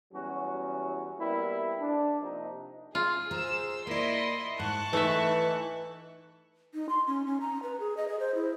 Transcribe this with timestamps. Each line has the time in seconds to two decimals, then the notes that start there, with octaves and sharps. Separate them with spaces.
0.12 E2 F#3 G3 C#4 F#4
1.19 G3 A#3 B3 E4
1.79 D4
2.21 C3 F3 A#3 D#4
2.95 F4 G#4
3.31 G#4 C5 A#5 E6
3.87 A#3 E4 D5 D#5 C6
4.59 G#2 A5 C#6 F#6
4.93 E3 A3 D#4 E5
6.74 D#4
6.89 C6
7.07 C#4
7.26 C#4
7.41 A#5
7.63 B4
7.80 G#4
7.97 D#5
8.08 G#4
8.20 C5
8.35 E4